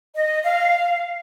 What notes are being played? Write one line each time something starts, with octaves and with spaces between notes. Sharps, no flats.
D#5
F5